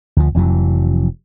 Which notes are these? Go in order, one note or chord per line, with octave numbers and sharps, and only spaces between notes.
D2 F3
F1 F2 E3 F#3